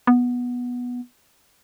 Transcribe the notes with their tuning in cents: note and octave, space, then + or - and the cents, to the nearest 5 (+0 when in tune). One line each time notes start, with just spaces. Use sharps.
B3 -10